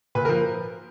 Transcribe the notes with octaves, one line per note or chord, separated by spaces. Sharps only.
A#2 B4
A#4
F3